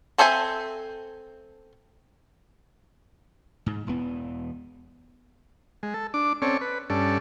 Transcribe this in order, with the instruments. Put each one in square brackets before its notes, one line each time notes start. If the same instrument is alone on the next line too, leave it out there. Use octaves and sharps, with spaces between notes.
[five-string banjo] C4 A4 C5 E5 G#5
[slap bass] G#2
E1 E2 E3 B3
[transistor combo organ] G#3
A4
D4 D6
C4 C#4 A4 C#5 D5
B4
G2 C#4 A4 D5